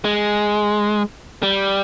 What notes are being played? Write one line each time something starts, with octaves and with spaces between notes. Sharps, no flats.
G#3
G3